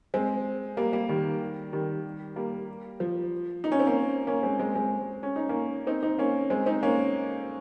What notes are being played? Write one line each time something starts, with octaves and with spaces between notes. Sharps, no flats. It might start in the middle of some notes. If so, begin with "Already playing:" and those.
G#3 C4
G3 A#3
G3 A#3
D#3 G3
D#3 G3
G3 A#3
F3
D#4
C#4
C4
A#3 C#4
A#3 C#4
G#3 C4
G#3 C4
G#3 C4
C#4
D#4
A#3 C#4
C4 D#4
C4 D#4
A#3 C#4
G#3 C4
C4 D#4
A#3 C#4